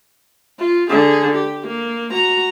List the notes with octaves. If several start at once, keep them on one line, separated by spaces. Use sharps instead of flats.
F4
D3 G#4
G4
A#3
F#4 A#5